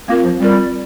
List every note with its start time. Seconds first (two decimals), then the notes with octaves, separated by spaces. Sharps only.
0.08 A#3 C4 F4 A#4
0.23 F3
0.39 G3 C4 F4 A#4